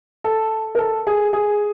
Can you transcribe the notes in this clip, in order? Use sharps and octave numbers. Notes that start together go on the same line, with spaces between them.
A4
A#4
A4
G#4
G#4